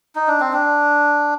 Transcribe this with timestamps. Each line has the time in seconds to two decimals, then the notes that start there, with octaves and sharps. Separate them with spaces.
0.15 D#4
0.28 D4
0.40 C4
0.53 D4